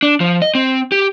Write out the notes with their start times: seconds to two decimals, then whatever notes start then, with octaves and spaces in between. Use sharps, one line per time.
0.03 D4
0.20 F3
0.42 D#5
0.55 C4
0.92 G4